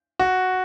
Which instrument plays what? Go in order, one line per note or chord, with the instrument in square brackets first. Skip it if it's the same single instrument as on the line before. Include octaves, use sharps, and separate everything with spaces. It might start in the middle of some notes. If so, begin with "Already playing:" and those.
[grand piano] F#4